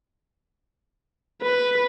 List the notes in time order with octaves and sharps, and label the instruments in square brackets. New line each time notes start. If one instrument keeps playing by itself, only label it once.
[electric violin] B4